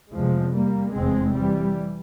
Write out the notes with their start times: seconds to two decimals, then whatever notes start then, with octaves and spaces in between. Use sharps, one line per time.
0.14 F1 E2 C3 F3 G#3
0.54 G3 A#3
0.94 F1 E2 C3 G#3 C4
1.35 E3 G3